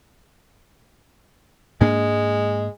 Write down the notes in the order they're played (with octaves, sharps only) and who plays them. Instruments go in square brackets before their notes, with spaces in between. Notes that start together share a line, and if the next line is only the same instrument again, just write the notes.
[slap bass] G#2 A#3 D4 [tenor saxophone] G#3